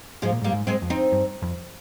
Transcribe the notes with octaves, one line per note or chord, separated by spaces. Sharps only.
G#2 F3 G#3
A#2
G#2
G3 A#3
G#2
G#3 C4
F2
C4 D#4
G2
F2